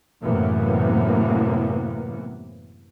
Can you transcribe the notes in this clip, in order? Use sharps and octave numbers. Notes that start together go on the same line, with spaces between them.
F#2 A2 C3 E3 A#3 B3